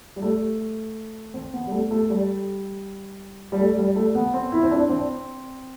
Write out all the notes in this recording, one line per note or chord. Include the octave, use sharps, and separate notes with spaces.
G3
A3
C4
B3
G3
A3
A3
G3
G3
A3
G3
A3
B3
C4
E4
C4
D4
C4